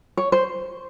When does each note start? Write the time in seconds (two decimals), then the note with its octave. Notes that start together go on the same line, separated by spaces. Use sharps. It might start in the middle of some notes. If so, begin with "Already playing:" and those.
0.17 C#5
0.32 C5